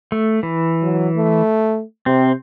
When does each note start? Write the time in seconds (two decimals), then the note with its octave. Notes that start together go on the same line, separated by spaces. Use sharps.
0.12 A3
0.43 E3
0.82 F#3
1.16 A3
2.06 C3 C4